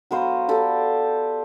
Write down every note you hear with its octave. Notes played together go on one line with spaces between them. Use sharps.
F#3 B3 C5 F5
G4 A4 D5